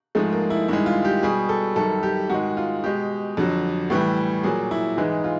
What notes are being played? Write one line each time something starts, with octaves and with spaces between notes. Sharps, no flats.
G#2 F3 G#3 A3
A#3
E4
G2 D#3 G#3 E4
F4
G4
B2 G3 G#4
A4
F#2 D#3 G3 A4
G4
G#2 D#3 G#3 F#4
F4
B2 G#3 G4
F2 D3 F#3
A2 E3 G3
A#2 F#3 G#4
E4
G#2 E3 G#3 D#4
F4